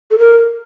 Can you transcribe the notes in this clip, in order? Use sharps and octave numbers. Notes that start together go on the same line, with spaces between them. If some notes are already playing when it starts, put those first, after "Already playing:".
A4
A#4